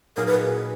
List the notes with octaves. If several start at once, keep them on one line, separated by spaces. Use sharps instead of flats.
A#2 F#3 A#3 D#4 G#4 A#4
B4